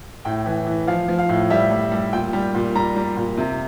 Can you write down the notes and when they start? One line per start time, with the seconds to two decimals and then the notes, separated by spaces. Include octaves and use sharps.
0.25 A2 G5
0.46 E3
0.67 E3
0.87 F3 F5
1.08 F3
1.19 F5
1.29 A2
1.50 G3 E5
1.71 G3
1.92 G3
2.13 A#2 G5
2.33 G3
2.55 A#2
2.75 G3 A#5
2.96 G3
3.17 A#2
3.38 C3